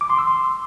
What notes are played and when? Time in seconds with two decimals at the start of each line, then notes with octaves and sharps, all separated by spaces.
0.01 D6
0.10 C6
0.18 E6
0.27 C6